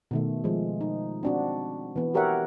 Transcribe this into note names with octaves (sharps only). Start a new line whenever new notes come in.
B2 D#3 A3
F3 G#3
D#4
C4 D4 F#4
E3 B3
F#4 G4 A#4 C#5 E5 F#5